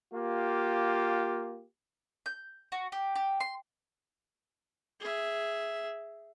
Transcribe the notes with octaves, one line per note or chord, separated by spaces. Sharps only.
A#3 F4 G4
G6
F#4
G4
G4
C6
G#4 E5